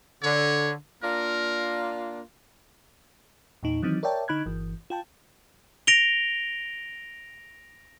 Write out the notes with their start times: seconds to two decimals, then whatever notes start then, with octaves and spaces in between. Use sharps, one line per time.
0.23 D3 C#5
1.03 A#3 D4 F4 A#4
3.63 E2 A#2 D#4
3.82 D#3 E3 F#3 C4 D#4
4.03 A#4 C#5 D5 E5 G5 A5
4.28 D3 D#4 B5 F#6 G#6
4.46 G1 E3
4.90 F4 G5 A5
5.87 A#6 D7 F7 G7